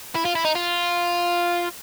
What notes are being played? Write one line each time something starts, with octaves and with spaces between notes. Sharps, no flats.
E4
F4
E4
D#4
F4